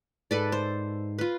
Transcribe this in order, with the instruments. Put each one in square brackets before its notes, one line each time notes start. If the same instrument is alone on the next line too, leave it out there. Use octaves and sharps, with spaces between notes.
[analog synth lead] G#2 [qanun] A4 B4 D5
[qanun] C5
F4 B4